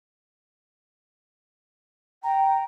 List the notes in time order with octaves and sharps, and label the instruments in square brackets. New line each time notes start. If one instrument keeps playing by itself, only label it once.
[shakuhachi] G5 [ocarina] A#5